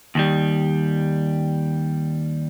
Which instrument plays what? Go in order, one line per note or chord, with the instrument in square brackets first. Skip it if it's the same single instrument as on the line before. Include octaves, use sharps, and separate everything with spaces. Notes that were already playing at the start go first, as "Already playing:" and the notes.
[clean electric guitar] D#2 D#3 G3